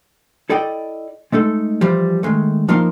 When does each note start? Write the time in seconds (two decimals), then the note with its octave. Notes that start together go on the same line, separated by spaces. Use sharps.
0.50 E4 A4 D5 D#5 G5
1.32 G#3 A3 D#4 A4
1.81 E3 F3 G3
2.23 D#3 E3 G#3 A3
2.68 F3 A#3 D#4 A#4 F5 C6